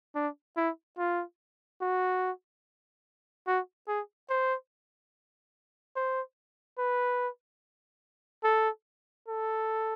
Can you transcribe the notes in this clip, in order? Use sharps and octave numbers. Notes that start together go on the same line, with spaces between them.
D4
E4
F4
F#4
F#4
G#4
C5
C5
B4
A4
A4